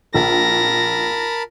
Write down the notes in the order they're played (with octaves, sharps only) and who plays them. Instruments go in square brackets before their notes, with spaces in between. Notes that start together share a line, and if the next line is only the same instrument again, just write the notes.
[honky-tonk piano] A#1 [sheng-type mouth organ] A#4 A5 B5 [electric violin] A#6